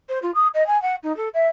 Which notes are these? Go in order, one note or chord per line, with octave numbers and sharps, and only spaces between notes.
C5
F4
D#6
D#5
G#5
F#5
D#4
A4
E5